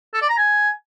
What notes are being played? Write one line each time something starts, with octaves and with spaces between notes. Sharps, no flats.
A4
D5
A#5
G#5